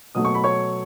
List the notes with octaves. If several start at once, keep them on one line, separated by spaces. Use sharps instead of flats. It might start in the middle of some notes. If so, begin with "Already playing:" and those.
B2 F#3 A3 D#6
C#6
B5
C#5 C#6